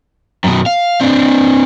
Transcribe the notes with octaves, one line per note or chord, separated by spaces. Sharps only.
F#2 B2
F5
C4 D4